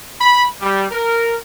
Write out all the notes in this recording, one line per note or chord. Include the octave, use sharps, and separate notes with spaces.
B5
G3
A#4